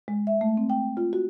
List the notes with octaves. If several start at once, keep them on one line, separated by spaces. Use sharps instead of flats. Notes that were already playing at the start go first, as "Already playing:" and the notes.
G#3
E5
A3
C4
G5
F4
F#4